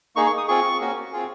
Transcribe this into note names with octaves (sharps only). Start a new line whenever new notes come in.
A#3 D#4 G#4 C#6
C#6
D#6
C4 F4 G#4 C#6
A#3 C#4 F#4
C4 F4 G#4